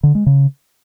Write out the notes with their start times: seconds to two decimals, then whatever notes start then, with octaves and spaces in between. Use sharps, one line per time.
0.03 D3
0.15 G#3
0.26 C#3